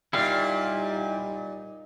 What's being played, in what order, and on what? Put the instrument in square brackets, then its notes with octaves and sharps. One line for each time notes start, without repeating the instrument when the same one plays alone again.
[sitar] A#2 [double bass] G3 D#4 [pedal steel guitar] E4 G4 F5